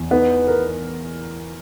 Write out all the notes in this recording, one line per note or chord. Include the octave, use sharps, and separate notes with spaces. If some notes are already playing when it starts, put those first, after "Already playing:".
Already playing: E2
B3 D#4
A#4